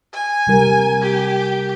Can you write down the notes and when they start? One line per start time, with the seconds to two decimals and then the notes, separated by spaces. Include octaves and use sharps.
0.12 G#5
0.47 C3 G3 A#4
1.01 G4